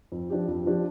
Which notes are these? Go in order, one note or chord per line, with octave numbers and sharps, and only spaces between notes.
F2
F3 D4 G4
F2
F3 D4 G4